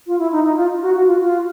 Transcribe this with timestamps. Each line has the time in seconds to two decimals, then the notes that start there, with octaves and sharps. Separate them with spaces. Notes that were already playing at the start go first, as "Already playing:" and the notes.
0.07 F4
0.19 E4
0.32 D#4
0.44 D#4
0.56 F4
0.77 F4
0.82 F#4
0.94 F#4
1.07 F4
1.20 F4